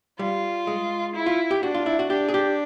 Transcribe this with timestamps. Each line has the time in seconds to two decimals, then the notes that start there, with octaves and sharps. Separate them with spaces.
0.19 G3 F4
0.67 G#3
1.15 E4
1.26 F4
1.51 G4
1.63 D4 F#4
1.74 F4
1.86 E4
1.99 F#4
2.10 D4 G4
2.29 G#4
2.34 G4